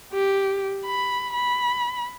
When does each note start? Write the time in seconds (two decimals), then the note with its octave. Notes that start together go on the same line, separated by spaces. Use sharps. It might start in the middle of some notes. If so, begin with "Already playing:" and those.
0.13 G4
0.86 B5
1.34 B5